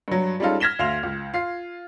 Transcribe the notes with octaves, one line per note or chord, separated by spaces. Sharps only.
G2 F#3
G3 G#3 C#4 D#4 F4 A4
F6 G#6 A#6 B6 E7 G7
D2 F5 C6 F7
C#2
F4 C7